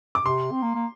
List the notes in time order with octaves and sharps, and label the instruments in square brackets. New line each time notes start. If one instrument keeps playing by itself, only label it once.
[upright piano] D6
[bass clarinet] C3 [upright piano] C6
[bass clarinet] C4
A#3
A#3